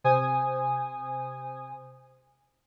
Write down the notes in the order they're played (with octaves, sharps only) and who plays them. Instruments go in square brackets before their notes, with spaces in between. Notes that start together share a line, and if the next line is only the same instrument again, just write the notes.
[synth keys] C3 C5 G#5 D#6